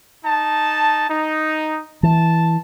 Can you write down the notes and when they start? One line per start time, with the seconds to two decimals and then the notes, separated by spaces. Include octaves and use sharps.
0.25 D#4 A5
1.09 D#4
2.03 E3 A5